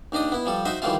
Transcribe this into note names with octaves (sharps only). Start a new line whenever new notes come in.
D#2 D#3 D4 D#5 D#6
B3 E4
F3 G3 A4
D#4 F#4 C5 D#5 E5
D#3 E3 F#3 G3 A3 F4